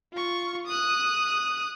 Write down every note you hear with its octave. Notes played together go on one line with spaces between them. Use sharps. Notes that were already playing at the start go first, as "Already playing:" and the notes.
F4 C#6
D#6 F#6